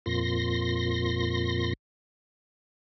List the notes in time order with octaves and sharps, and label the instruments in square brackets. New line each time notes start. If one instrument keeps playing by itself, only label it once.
[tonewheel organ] F2 A#2 C6 A#6